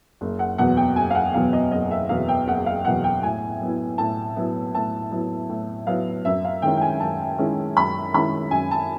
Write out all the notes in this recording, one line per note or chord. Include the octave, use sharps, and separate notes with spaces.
F#1
F#5
E2 B2 F#3 B3 F#5
G5
F#1 G#5
F5
F#5
E2 B2 F#3 B3 F5
D#5
F#1 D#5
E5
E2 B2 F#3 B3 F5
G5
F#1 F#5
F5
E2 B2 F#3 B3 F#5
G5
A2 G#5
F#3 B3 E4
A2 A5
F#3 B3 E4
A2 A5
F#3 B3 E4
A2
F#3 B3 E4 F5
F#2 E5
F5
D#3 G#3 C#4 E4 G5
G5
G#5
F#2 A5
D#3 G#3 C#4 E4
F#2 B5
D#3 G#3 C#4 E4 B5
F#2 G#5
A5